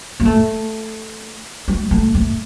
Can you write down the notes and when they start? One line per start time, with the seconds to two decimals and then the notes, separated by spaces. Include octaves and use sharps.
0.20 A#3
0.25 A3
1.68 G#3
1.91 A3
2.15 A3